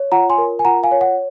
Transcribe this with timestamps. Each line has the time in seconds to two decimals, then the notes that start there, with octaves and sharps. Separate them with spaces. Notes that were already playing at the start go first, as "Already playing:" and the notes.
Already playing: C#5
0.12 F4 F#5 A#5
0.30 G#5 C6
0.38 A#4
0.59 G#5
0.65 F4 F#5 A#5
0.83 F5 G#5
0.91 C#5
1.01 F#5